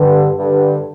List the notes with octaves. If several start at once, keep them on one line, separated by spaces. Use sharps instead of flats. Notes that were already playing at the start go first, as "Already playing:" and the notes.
Already playing: G2 D3
G2 D3